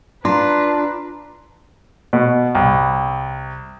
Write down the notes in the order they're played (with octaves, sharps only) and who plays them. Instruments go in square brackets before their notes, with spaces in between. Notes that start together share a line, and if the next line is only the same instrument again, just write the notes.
[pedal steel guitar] D4 [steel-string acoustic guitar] F4 [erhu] B4 [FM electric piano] A#5 C6
[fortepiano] B2
C2